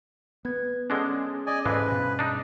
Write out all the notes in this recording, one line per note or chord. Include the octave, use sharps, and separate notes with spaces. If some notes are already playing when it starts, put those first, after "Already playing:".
B3 B4 G#6
D3 G#3 C#4 D4 G#4
D5 D#5 G#5
F2 G#2 E3 G#3 B4
G2 B2
D4 D#4